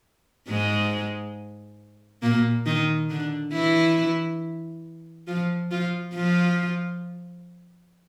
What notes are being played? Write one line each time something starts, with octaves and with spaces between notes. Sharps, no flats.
G#2 G#3
A#2 A#3
D#3 D#4
D3 D4
E3 E4
F3 F4
F3 F4
F3 F4